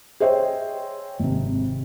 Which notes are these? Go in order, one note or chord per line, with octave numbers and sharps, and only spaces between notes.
G#4 C5 C#5 D#5 E5 G5
G#1 C3